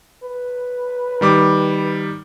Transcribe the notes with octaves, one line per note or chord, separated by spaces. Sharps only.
B4
D#3 G3 D6